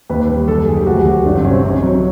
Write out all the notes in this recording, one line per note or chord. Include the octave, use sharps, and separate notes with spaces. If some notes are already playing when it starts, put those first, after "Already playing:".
D#2 B4
G3
F#1 A4
D#3 G#4
G4
D2 F#4
G4
F#3
G1 D4
C4
C3 C#4
C4
B1 C#4
F#3